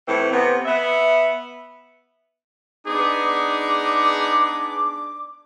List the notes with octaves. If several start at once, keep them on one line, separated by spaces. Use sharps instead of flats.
A2 E3 C4
C3 B3
B3 E5
B3 D4 D#4 G#4 D6